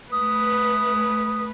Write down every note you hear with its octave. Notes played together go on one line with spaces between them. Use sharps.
A3 B4 D#6